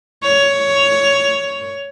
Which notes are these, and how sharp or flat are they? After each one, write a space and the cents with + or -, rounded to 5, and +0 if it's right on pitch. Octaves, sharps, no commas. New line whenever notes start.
C#5 +10